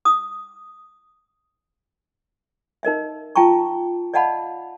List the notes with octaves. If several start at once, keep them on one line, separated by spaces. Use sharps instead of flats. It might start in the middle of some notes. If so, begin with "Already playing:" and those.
D#6
D#4 A#4 D#5 E5
F4 G5 A5 A#5 C#6
D5 D#5 F5 F#5 A5 B5